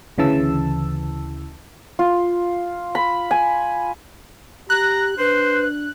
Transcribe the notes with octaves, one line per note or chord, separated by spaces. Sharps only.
D2 C#3 E3 A5 E6
F4
B5
G#5
G4 A#5 F#6
D4 B4 C5